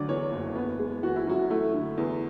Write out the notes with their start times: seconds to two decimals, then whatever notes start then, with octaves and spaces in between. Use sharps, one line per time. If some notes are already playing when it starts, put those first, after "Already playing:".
Already playing: D2 D3 F#3 D5
0.08 E2 C#5
0.32 F#1
0.56 B3
0.79 G#3
1.03 E3 F#4
1.16 E4
1.27 F#2 F#4
1.50 A3 E4
1.74 D3
1.97 E2